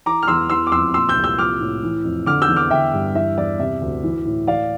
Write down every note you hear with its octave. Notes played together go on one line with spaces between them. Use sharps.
E3 A#5 D6
F6
E2 C6 E6
E3 C6 E6
D6
F2 C6 E6
A#2 C6 E6
E6 G6
C2
E6 G6
F3 D6 F6
A2
E3
F2
D3 D6 F6
E6 G6
E2
D6 F6
D3 E5 G5
G2
E3 E5
E2 D5
C3 E5
D2
E3
A2
E3 D5 F5